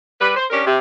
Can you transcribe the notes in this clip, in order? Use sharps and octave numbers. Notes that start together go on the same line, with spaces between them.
G3 B4
C5
C#4 D4 G4 A#4
C3